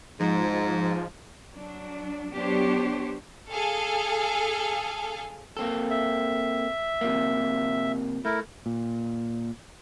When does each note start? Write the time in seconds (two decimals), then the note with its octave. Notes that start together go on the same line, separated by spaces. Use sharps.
0.20 G#2 F3
1.55 F#3 D4
2.34 F#3 B3 D4 G4 C5 C#5
3.52 G#4 A4 F5
5.57 A#3 C4 A4
5.90 E5
7.01 C3 F3 A#3
8.25 A3 E4 A#4
8.66 A#2